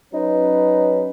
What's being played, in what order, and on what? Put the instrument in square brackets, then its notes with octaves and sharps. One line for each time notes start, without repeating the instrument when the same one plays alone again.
[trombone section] F#3 C#4 B4 [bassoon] D#4